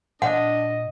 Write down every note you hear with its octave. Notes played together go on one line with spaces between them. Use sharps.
A#2 D4 D#5 F#5